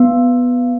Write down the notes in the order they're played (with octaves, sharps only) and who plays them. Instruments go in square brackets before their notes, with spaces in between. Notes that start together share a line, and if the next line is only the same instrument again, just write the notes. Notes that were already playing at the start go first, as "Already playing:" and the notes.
Already playing: [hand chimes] B3